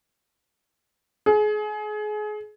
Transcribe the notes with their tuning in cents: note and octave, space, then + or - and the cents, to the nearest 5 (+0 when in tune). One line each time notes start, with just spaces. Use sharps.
G#4 +30